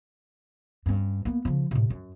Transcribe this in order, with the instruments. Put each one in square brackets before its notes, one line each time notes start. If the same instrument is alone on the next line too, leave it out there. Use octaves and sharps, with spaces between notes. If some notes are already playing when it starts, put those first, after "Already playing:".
[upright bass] G2 C#4
A#3 B3
C#3 F3
A2 C3
F#2